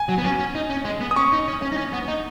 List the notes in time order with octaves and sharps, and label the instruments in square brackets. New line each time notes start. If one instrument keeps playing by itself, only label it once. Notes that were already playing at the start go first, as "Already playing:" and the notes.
Already playing: [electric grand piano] G#5
[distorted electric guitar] F#3
B3
C#4
C#4
D#4
C#4
G#3
B3
[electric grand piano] D#6
[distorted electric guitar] C#4 [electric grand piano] C#6
[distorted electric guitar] D#4
C#4
C#4
D#4
C#4
B3
D#4